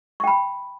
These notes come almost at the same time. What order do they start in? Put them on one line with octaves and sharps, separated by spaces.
C#6 G5 B5